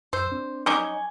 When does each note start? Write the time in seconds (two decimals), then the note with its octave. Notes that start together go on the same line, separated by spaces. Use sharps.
0.13 F#2 C5 E6
0.32 C4 D4
0.66 C#4 D#4 C#6 D6
0.84 G#5